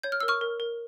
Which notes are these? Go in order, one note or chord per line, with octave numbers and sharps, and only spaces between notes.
C#5 G6
F6
A#4 E6
C#6 F6
A#4
A#4